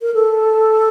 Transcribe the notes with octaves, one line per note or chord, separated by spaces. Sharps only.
A#4
A4